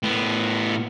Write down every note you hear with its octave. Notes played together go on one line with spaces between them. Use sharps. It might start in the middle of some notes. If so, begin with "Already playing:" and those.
A2 B3